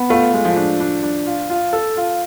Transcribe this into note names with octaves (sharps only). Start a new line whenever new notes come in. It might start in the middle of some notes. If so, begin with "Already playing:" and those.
Already playing: B3
A3 F4
G#3
F3
D4
D4
D4
F4
F4
A4
F4